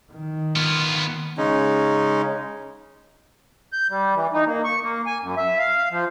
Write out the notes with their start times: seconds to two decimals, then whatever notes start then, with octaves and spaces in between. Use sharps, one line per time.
0.12 D#3
0.56 B3 F4
1.38 C#3 G#3 C#4 D#4
3.73 G6
3.90 G3
4.15 E3
4.34 D#4
4.46 A#3
4.64 C#6
4.83 A#3
5.06 G#5
5.22 F#2
5.37 E5
5.58 F5
5.91 F3